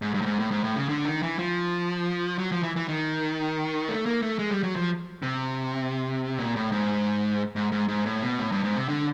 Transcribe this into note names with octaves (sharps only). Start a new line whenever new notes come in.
G#2
G2
A2
G#2
A2
G#2
A2
C#3
D3
D#3
E3
F3
F#3
F3
E3
E3
D#3
A3
A#3
A3
G#3
G3
F#3
F3
C3
A#2
A2
G#2
G#2
G#2
G#2
A2
B2
A2
G2
G#2
C3
D3